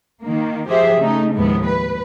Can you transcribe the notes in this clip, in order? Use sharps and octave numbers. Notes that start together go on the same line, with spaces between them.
D#3 A#3
F3 G4 G#4 C5 E5
C#3 A3 C#4 D#4
D#2 A2 F3 G#3 B3
B4